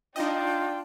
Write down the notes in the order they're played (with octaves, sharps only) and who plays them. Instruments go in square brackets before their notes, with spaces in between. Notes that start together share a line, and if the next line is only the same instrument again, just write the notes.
[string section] D4 [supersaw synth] D#4 D#5 [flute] F4 [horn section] G5